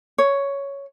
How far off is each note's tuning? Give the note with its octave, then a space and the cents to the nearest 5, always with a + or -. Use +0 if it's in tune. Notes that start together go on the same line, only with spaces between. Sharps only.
C#5 +5